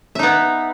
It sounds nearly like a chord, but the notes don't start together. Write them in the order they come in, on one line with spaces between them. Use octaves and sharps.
E5 D#4 B3